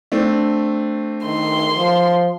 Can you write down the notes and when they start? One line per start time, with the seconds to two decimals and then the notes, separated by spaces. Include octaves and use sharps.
0.12 A3 C4 D4
1.25 D#3 C6
1.77 F3